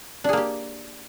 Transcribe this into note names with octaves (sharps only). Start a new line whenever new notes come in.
A#3 D4 G4 G#4